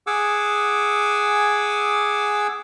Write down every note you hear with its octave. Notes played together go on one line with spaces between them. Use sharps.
G#4 F#5 G#5 D6 E6